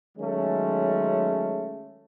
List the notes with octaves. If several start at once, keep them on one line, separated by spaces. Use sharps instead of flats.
D#3 F#3 G#3 A3 C#4